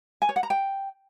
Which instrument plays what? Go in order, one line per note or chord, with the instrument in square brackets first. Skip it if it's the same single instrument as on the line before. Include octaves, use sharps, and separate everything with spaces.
[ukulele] G#5
C#5
F#5
A#5
G5